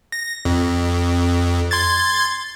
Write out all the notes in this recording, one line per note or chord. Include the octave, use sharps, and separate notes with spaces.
A#6
F2
C6 G#6 A6